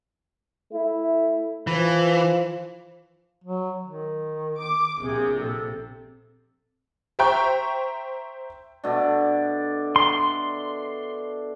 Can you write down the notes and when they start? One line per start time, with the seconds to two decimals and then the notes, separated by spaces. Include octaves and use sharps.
0.71 A3 E4
1.67 E3 F3
3.44 F#3
3.85 D#3
4.59 D6
5.00 A#1 C3 G#4
5.39 A4
7.19 C5 E5 G5 A#5 C#6 G6
8.84 B2 A3 D4
9.96 C6